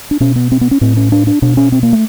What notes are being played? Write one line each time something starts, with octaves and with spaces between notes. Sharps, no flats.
D4
B2 C#4
B3
C4
B3
C#4
A2 C4
C#4
D4
D4
B2 D4
C#4
C4
A#3
A3